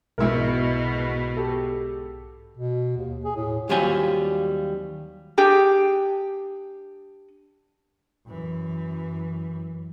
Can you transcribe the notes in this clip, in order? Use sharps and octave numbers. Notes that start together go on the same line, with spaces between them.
B1 G#2 B2 E4 G#4 A#4
G4 A4
B2
D#2
G#4
A2
D#2 F#3 G3 C4 F4 G#5
D4 G4 G#4
F#2 E3